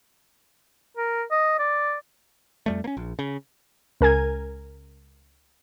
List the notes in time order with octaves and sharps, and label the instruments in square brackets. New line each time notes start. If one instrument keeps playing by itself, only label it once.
[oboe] A#4
D#5
D5
[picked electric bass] F2 G3 A3
A#3 C#4
A#1
C#3
[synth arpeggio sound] C#2 A#4 G#5 G#6